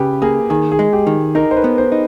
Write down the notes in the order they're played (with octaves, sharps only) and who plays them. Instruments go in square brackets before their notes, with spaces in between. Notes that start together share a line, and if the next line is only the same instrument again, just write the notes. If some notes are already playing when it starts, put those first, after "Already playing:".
Already playing: [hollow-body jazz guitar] C#3 [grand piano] G4 B4
[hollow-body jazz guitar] A#3 [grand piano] G#4
[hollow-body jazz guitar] D#3 [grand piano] G#4
[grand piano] G#4
[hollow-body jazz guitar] G#3
[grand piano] G4
[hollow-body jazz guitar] D#3
[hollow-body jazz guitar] D#4 [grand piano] A#4
[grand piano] C5
B4
[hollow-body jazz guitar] B3
[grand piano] C5
[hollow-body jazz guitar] D#4